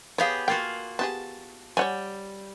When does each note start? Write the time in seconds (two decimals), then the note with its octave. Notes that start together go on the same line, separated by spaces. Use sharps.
0.18 B3 G4 G#4 C#5 F5
0.48 A#3 F4 F#4 G5
0.99 B3 G4 G#4 A5
1.77 G3 C#5 F#5 G#5